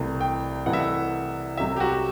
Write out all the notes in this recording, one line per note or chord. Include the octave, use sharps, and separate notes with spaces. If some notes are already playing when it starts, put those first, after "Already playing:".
Already playing: C2 C3 E3 A3
G5
C2 C3 E3 A3 F#5
E5
F#5
C2 C3 F#3 A3 E5
G4
F#4